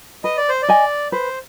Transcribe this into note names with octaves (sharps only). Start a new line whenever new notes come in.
B4 D#5
D5
C5
D5
D#5 G#5
B4 C5